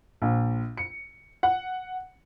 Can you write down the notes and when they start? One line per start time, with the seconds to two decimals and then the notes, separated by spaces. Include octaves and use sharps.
0.22 A#1
0.78 C#7
1.43 F#5